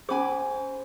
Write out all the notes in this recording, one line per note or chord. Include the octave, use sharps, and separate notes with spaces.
C#4 G#4 C5 G#5 B5 D6